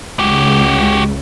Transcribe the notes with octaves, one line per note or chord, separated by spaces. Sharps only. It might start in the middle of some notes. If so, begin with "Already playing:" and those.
C#2 F#4 G4